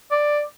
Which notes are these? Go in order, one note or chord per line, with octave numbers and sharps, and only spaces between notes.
D5